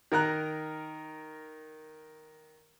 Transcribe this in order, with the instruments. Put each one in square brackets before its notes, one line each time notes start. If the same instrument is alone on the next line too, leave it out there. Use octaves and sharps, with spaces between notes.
[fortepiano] D#3 A#4 A#5 F#6